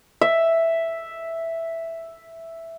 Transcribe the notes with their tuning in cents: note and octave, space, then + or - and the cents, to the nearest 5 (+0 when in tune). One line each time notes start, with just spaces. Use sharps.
E5 +0